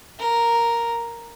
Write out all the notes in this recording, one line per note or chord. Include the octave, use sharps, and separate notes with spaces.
A#4